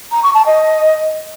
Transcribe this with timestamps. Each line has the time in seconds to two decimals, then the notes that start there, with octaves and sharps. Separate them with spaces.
0.11 A#5
0.23 C#6
0.34 A5
0.46 D#5